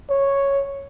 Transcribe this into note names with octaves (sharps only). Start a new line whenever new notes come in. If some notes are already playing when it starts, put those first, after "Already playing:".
C#5